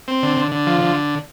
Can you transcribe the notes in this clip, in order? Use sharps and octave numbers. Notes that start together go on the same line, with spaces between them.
C4
D3
D3
D3
F3
D3